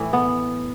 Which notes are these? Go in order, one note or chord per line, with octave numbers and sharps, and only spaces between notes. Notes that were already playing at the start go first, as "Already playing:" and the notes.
Already playing: A2 E3
B3